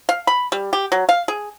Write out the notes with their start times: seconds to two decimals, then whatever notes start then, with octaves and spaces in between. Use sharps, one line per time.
0.09 F5
0.27 B5
0.52 G3
0.73 G4
0.92 F#3
1.09 F5
1.28 G#4